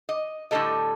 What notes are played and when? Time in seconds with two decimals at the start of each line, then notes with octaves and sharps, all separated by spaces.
0.09 D#5
0.51 A2 D3 G3 A3 A4 D#5